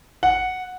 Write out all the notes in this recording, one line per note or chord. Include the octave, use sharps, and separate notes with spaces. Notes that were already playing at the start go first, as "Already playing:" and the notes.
F#5